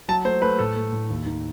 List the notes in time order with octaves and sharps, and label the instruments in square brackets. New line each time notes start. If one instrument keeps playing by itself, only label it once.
[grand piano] F#3 A5
A3 C5
A3 B4
A2 A4
A3
A2
D#2
D#3